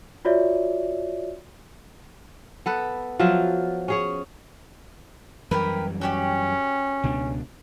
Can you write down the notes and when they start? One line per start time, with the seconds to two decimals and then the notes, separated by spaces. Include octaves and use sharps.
0.25 F4 F#4 C#5 D5 E5
2.66 B3 A4 B4
3.19 F3 F#3 F4 E5
3.88 C#4 G#4 C#5
5.51 F#2 E3 G3 G4 A#4 B4
6.01 C#4 F#4 G4 D5
7.04 C#2 B2 D4